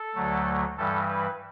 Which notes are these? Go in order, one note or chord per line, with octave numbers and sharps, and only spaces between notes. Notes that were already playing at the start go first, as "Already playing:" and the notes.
Already playing: A4
D2 D3 F#3 A3
G2 E3 G3 A4
B4